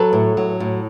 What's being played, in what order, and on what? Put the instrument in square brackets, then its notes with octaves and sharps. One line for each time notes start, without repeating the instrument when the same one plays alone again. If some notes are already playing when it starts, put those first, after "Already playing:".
Already playing: [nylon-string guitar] F#3 A4 B4
A2
F#3
A2